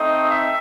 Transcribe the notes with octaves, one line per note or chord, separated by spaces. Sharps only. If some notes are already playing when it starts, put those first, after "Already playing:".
Already playing: A3 C4 D#4 D#5
E5